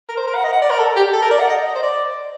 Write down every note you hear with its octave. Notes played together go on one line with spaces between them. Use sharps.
A#4
C5
A#4
F#5
D#5
F#5
D5
A#4
A4
G4
A4
A#4
D5
F#5
D#5
D#5
C5
D5